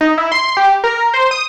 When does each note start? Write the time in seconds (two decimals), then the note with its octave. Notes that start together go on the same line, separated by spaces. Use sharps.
0.01 D#4
0.18 E4
0.32 C6
0.57 G4
0.84 A#4
1.14 C5
1.31 D#6